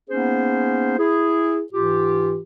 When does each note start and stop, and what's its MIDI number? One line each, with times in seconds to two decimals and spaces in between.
0.09 0.95 58
0.09 0.95 59
0.09 0.95 61
0.09 0.95 63
0.09 0.95 68
0.09 0.95 72
0.98 1.62 64
0.98 1.62 68
1.73 2.38 44
1.73 2.38 52
1.73 2.38 65
1.73 2.38 67